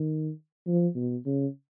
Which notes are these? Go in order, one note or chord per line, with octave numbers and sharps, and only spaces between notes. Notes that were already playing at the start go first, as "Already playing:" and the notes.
Already playing: D#3
F3
B2
C#3